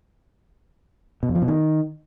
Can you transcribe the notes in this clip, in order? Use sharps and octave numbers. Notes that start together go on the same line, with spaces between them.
B2
F2
F3
B2
D#3